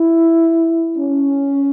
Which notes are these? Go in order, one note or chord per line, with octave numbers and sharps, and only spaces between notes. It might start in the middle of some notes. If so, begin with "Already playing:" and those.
Already playing: E4
C#4